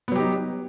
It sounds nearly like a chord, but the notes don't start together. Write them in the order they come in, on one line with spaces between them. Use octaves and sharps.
B3 F#3 G4 D#4